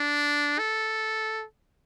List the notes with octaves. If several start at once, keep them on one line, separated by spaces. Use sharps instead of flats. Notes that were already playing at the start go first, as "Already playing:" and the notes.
Already playing: D4
A4